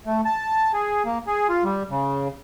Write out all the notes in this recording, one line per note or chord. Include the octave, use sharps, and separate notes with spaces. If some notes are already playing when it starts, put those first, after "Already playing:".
A3
A5
G#4
A#3
G#4
F4
G3
C#3